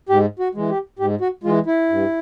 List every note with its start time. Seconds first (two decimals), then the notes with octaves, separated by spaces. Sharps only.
0.09 G#2 G4
0.39 F#4
0.55 E3 G#3
0.69 G4
0.99 G#2 G4
1.21 F#4
1.44 E3 G#3 F4
1.66 E4
1.89 G2